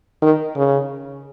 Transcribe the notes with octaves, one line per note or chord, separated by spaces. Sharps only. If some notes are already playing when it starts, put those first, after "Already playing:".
D#3
C#3